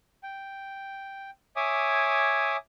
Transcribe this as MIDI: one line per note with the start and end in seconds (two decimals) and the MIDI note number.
0.23 1.30 79
1.56 2.57 73
1.56 2.57 76
1.56 2.57 80
1.56 2.57 86
1.56 2.57 87